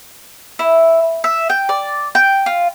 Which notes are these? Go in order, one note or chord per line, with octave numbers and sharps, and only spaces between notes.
E4
E5
G5
D5
G5
F4